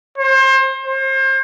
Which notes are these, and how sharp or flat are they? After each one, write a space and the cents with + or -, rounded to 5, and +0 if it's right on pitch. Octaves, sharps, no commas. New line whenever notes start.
C5 +30
C5 +35